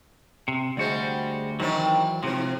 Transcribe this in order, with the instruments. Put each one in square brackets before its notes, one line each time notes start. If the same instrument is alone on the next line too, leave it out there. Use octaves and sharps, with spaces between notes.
[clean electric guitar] C3
[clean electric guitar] D2 F#4 [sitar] G3 G#3 C5
[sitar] D#3 C4 D4 [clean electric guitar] E3 F#3
[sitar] G#2 C5 [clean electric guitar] C3 F3